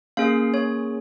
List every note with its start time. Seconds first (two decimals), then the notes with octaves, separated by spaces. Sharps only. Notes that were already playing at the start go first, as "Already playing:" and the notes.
0.17 A#3 C#4 G#4 F5
0.54 C#5